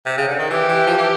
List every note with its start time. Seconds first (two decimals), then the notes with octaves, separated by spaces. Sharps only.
0.06 C3
0.17 C#3
0.28 D3
0.39 D#3
0.50 E3 G4
0.69 E3
0.86 F3
0.97 E3